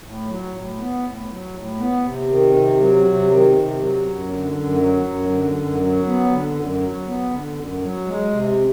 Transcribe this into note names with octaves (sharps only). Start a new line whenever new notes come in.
A2
F#3
A2
B3
A2
F#3
A2
B3
C3
D#3
C3
F#3
C3
D#3
C3
F#3
F#2
D3
F#2
F#3
F#2
D3
F#2
F#3
B3
D3
F#2
F#3
B3
D3
F#2
F#3
G#3
C3